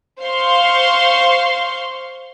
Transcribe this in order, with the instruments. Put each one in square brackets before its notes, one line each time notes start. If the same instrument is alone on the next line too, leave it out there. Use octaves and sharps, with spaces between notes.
[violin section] C5 F5 C6 C#6